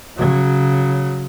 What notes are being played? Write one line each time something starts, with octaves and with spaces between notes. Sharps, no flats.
C#3 F#3